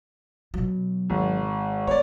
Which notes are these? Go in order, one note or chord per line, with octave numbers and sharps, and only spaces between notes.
B2 F#3
G#1
B3 C#5 D5